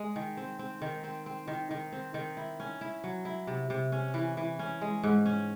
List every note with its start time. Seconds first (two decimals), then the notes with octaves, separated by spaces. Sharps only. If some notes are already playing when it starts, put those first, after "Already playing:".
Already playing: G#3
0.16 D#3
0.37 C4
0.59 C4
0.82 D#3
1.04 C4
1.26 C4
1.48 D#3
1.71 D#3
1.93 C4
2.14 D#3
2.37 E4
2.60 C#4
2.81 E4
3.04 F#3
3.25 E4
3.47 C3
3.70 C3
3.92 C#4
4.14 E3
4.37 E3
4.59 C#4
4.81 G#3
5.03 G#2
5.26 C#4